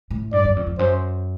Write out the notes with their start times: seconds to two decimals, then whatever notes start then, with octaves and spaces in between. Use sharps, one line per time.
0.11 A2
0.32 G2 D5
0.45 F#2
0.56 F2
0.67 F2
0.79 F#2 C5